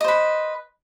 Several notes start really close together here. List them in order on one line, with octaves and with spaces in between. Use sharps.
D#5 C5 B4